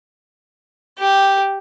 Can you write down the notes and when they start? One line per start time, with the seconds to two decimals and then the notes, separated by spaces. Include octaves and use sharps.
0.98 G4